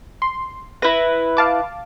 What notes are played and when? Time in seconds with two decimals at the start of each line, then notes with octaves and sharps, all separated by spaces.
0.22 C6
0.82 E4 B4 A#6
1.37 F5 A5 D6